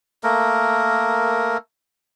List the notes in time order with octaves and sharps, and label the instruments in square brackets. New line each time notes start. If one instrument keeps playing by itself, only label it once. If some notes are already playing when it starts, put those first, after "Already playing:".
[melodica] A3 A#3 A#4